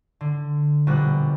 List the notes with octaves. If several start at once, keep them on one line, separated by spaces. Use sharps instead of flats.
D3
A#1 B2 G3 F#6